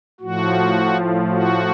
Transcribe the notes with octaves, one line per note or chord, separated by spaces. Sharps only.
A2 F3 F#4
F#4